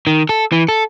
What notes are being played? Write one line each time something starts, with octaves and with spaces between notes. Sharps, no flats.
D#3
A4
E3
A4